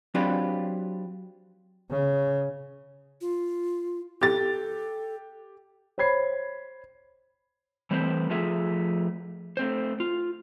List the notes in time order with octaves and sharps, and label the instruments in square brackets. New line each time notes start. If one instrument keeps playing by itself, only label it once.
[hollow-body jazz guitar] F#3 C4 D4 F4 G4 B4
[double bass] C#3
[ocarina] F4
[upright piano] G4 A6 [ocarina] A4
[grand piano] C5 C#5 B5 G#6 C7
[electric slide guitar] E3 G3 A3 C4 B4 C5
F3 A3 F4 G#4 E5
A3 C4 C5
F4